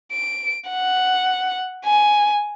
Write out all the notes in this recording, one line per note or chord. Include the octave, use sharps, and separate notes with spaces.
D7
F#5
G#5